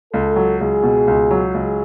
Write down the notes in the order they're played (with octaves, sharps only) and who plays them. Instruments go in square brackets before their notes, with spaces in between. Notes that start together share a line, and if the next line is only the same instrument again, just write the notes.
[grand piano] C#2 [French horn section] A4
[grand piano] F#3
[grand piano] C#2 [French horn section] G#4
[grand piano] B2
C#2
F#3
[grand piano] C#2 [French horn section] G#4